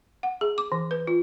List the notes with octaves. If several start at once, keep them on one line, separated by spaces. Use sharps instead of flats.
F#5
G#4
D6
E3
B4
F4